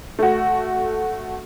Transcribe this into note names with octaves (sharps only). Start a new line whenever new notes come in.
A3 F#4